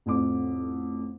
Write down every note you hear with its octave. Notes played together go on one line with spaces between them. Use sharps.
A1 F2 D6